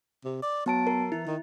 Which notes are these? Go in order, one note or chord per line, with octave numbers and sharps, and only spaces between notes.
C3
D5
F#3 B3 A5 D7
A#4
E3 E4
D#3